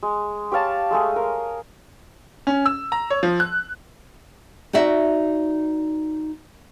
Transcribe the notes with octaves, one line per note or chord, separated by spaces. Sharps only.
G#3
G4 C#5 F5 A5
G#3 A3 G#4
A#4
C#4
E6
A#5
C#5
F3
F#6
D#4 F#4 D5 E5